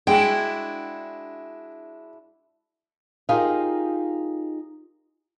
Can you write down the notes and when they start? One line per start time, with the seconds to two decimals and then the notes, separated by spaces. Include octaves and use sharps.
0.07 G#3 D4 E4 F#4 G5
3.29 D#4 F4 G4 G#4 A#4 F5